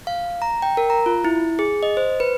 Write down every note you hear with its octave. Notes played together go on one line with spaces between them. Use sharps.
F5
A#5
G5
A#4
A#5
F4
E4
G#4
D#5
C5
B4